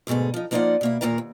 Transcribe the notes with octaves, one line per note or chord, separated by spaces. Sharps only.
D2 G#2 B2 G#4 A4
F3 D#4
F3 A#3 D#4 F4 D5 F#5
B2 A#3 E4
E2 A#2 D#3 A#3 A#4 A#5
D#2